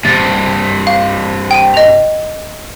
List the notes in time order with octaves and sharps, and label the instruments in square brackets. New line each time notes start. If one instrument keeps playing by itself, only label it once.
[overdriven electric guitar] G2 C3 [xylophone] A6
[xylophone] F5
G5 D#7
D#5 F7